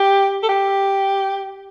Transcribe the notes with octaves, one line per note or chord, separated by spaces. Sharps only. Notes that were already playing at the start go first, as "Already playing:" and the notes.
Already playing: G4
A4
G4